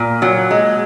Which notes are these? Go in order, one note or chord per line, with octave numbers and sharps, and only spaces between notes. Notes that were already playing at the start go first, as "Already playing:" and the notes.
Already playing: A#2
F#3
G#3